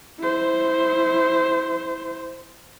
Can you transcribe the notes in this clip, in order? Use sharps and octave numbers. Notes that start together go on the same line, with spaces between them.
E4 C5